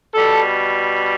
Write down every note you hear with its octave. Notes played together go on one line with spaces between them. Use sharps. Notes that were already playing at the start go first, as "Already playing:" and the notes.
B2 G3 A4